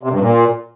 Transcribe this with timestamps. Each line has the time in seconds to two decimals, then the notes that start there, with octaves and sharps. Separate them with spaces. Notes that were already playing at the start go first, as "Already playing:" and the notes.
0.03 C3
0.12 G2
0.21 A#2